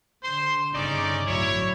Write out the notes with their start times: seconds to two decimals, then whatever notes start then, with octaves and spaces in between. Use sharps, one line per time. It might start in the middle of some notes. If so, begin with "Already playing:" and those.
0.23 D3 C5 C6
0.74 G1 C#3 C#4 D#4 D5
1.27 A1 D2 F#3 E4 C#5